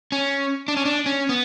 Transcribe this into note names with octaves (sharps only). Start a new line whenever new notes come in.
C#4
D4
C#4
D4
C#4
B3